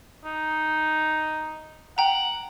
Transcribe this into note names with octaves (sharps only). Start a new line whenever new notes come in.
D#4
F#5 G5 A#5